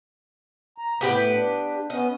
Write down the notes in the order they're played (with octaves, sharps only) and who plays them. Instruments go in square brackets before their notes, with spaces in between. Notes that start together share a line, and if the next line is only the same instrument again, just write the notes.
[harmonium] A#5
[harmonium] A2 [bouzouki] B3 G4 B4
[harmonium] D4
[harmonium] B3 C#4 [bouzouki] D#5